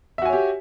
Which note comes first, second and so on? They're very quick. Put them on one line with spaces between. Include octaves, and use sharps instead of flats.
E5 F#4 G#5 C#5 G4